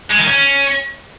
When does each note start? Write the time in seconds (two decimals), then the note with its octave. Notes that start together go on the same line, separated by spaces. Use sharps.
0.10 G#3
0.19 D#3
0.27 C#4